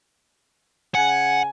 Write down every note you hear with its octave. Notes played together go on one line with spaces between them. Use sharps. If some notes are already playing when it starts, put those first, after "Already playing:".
C#3 F#5 G#5